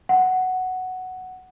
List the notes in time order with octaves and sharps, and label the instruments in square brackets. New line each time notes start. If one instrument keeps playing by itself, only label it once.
[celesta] F#5